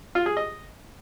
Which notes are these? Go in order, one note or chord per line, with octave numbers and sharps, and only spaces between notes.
F4
G#4
D#5